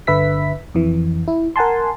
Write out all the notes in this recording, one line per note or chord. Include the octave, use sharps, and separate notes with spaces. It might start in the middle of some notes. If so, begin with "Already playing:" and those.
G1 D3 B4 E5 B6
F2 E3
E4
A#4 F#5 G#5 A5 C6